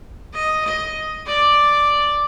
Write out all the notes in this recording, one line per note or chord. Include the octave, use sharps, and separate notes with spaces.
D#5
D#5
D5